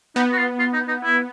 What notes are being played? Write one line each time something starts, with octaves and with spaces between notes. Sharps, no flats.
B3 D#4
F#4
F4
F4
D#4
D#4
E4